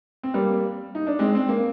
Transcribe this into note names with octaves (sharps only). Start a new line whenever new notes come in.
C4
G3 A#3
D#4
D4
G#3 C4
C4
A#3